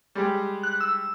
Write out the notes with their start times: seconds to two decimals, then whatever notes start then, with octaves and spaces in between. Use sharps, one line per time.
0.15 G3 G#3 G4
0.63 F#6
0.80 E6